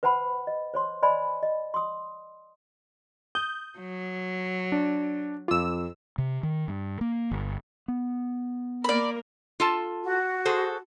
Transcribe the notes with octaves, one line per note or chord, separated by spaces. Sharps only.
B4 C5 F#5 A5 B5
D#5
C5 C#5 C6
C5 D5 D#5 G#5 B5
D#5
C6 D#6
D#6 G6
F#3
D4
F2 F4 D6 E6
C3
D#3
G2
A#3
G1
B3
A#3 A#4 D5 B5
F4 A4 A5
F#4
G#4 A4 C5